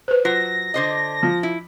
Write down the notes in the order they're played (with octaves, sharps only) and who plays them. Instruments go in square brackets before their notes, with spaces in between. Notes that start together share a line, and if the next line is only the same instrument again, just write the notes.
[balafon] B4 C5
[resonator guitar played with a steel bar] F#3 [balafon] F4 [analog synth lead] A#6
[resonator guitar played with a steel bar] D3 C5 D#5
[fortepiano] F3
[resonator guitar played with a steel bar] E4